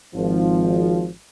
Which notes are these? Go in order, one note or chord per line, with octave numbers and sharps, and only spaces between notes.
G#1 F3